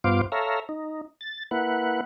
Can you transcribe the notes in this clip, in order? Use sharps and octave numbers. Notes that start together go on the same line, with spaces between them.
G2 B3 F4 C5 F5 D6
A4 C#5 E5 F5 A#5
D#4
A6
A#3 E4 B4 F#5